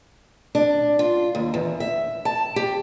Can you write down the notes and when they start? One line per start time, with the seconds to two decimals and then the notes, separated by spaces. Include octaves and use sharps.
0.55 D4
0.99 F4
1.35 D#2
1.54 E2
1.80 E5
2.25 A5
2.56 G4